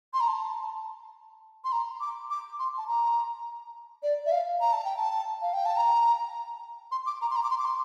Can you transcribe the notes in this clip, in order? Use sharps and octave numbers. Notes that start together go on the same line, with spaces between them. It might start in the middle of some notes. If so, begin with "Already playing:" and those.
C6
A#5
A5
C6
A#5
D6
D6
C6
A5
A#5
D5
E5
F5
A#5
A5
G5
A5
F5
G5
A5
A#5
C6
D6
A#5
C6
A#5
D6
C6
D6
C6